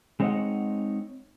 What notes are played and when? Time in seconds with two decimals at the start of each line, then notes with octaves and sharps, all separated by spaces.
0.20 G#3 C4 D#4 C#5 D#5 F#5